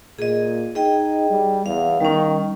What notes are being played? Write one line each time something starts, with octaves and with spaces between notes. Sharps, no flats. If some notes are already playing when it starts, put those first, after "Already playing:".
A#2 G#4 D#5
D#4 G#4 D#5 G5
G3
E2 F5
D#3 G3 C#4